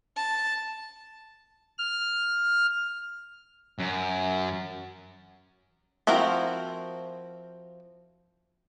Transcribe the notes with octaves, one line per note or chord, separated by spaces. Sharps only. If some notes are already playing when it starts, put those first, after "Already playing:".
A5
F6
F#2
F3 C4 E4 F#4 A#4